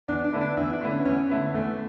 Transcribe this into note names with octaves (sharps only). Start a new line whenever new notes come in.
E2 D4
D4
D3 A3 E4 B4
D4
E2 E4
D4
D3 A3 E4 B4
C#4
E2 C#4
D3 A3 E4 B4
E2 A3